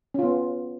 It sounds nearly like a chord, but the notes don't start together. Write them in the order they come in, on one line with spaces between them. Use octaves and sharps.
C#4 F4 B3